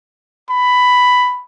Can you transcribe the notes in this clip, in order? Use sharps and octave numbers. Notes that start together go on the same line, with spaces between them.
B5